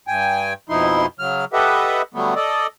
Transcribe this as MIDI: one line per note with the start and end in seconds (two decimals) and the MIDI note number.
0.08 0.53 43
0.08 0.53 79
0.08 0.53 80
0.69 1.06 41
0.69 1.06 47
0.69 1.06 53
0.69 1.06 63
0.69 1.06 64
0.69 1.06 84
1.19 1.45 49
1.19 1.45 54
1.19 1.45 89
1.53 2.02 67
1.53 2.02 69
1.53 2.02 71
1.53 2.02 75
1.53 2.02 76
1.53 2.02 78
2.14 2.34 50
2.14 2.34 54
2.14 2.34 55
2.14 2.34 57
2.14 2.34 59
2.36 2.67 69
2.36 2.67 74
2.36 2.67 75